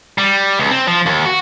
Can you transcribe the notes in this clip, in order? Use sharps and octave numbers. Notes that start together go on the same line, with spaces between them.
G3
C#2
C4
F3
D#2
F#4